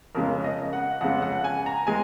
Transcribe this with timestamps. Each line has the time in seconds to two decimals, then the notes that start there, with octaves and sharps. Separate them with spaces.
0.15 F2 C#3 G#3 A#4
0.44 D#5
0.73 F#5
1.01 F2 F#5
1.04 C#3 G#3
1.22 F#5
1.44 G#5
1.66 A#5
1.87 G#3 G#5